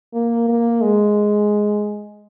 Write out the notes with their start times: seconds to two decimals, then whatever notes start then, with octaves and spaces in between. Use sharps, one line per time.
0.14 A#3
0.48 A#3
0.82 G#3